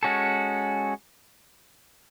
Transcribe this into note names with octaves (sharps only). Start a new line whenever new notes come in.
G#3 C#4 F#4 A4